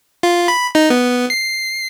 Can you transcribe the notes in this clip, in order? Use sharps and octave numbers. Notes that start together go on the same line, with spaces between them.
F4
B5
D#4
B3
C7